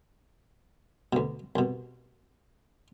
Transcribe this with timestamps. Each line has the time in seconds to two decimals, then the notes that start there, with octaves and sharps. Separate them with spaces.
1.13 D2 B2
1.56 C2 B2